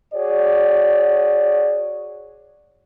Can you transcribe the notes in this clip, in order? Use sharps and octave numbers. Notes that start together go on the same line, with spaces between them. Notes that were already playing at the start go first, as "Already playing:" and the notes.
F#4 G#4 C#5 D5